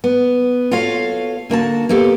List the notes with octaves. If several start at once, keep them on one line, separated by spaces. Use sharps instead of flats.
B3
F4 F#4 A4 C#5 F5
D3 A#3 F#4 A5
A#3 B3 G4 A4